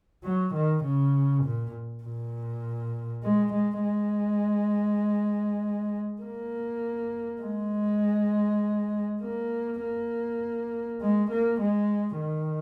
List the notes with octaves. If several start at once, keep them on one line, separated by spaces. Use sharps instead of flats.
F#3
D#3
C#3
A#2
A#2
G#3
G#3
G#3
A#3
G#3
A#3
A#3
G#3
A#3
G#3
D#3